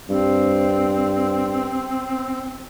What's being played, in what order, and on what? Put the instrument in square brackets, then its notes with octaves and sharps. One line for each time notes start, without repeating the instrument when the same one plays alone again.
[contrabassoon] G2 [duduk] C4